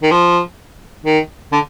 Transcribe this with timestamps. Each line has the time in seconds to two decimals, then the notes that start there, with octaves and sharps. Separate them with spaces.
0.03 D#3
0.11 F3
1.04 D#3
1.52 D3